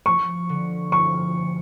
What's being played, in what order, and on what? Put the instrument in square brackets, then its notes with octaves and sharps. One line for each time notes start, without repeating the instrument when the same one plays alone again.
[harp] F3 [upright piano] C#6
[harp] D3
[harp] F3 [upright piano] C#6